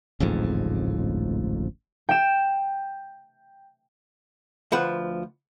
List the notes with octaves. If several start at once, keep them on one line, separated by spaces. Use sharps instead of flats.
D1 A1 F2 G#2
G5 E7
D2 F3 B4 F#5